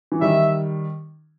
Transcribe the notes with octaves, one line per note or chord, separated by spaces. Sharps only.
E3
D#3 G3 E5